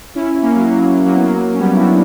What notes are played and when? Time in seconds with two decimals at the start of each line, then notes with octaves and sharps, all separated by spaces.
0.15 C#4 E4
0.42 A#3 C#4
0.56 F#3 A#3
0.70 F#3
0.87 F#3
1.05 F#3 A#3
1.16 B3
1.24 F#3 A#3
1.54 C#4
1.59 G3 B3
1.74 E4
1.78 D4 F#4